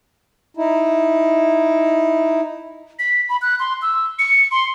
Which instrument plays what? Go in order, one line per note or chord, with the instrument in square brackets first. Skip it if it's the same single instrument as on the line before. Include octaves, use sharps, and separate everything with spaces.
[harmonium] D#4 E4
[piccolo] B6
B5
F#6
C6
E6
C#7
C6